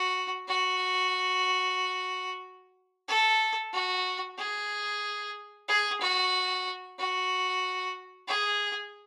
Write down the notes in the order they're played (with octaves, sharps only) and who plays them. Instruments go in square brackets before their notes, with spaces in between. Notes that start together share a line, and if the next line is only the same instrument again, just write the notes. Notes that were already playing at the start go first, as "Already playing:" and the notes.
Already playing: [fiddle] F#4
F#4
A4
F#4
G#4
G#4
F#4
F#4
G#4